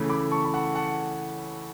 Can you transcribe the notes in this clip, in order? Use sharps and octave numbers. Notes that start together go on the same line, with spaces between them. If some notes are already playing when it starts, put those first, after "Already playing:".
Already playing: C#3 E3 A3
B5 D6
A5 C#6
B5
F#5 A5
F#5 A5